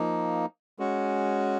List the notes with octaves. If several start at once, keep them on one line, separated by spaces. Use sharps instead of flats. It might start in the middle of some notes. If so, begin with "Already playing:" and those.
Already playing: F3 A#3 D#4
G#3 C#4 F#4